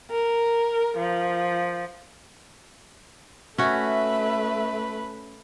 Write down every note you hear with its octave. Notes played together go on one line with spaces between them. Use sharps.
A#4
F3
A3 C#4 F#4 B4 E5